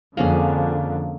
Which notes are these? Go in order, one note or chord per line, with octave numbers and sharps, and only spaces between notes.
F2 D3 A#3 C#4 G#4